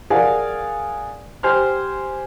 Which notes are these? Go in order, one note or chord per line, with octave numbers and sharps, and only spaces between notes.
G#4 A#4 D5 F5 F#5 G#5
G4 C5 G#5 F6